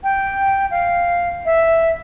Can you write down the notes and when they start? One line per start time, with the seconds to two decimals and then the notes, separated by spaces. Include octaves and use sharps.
0.04 G5
0.71 F5
1.46 E5